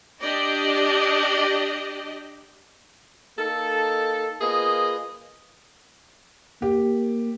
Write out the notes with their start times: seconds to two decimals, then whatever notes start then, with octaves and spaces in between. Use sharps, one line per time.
0.21 D4 G4 D5 D#5
3.38 A#3 D#4 A4
4.41 A#3 F4 G#4 B4 D#5
6.62 A#3 G4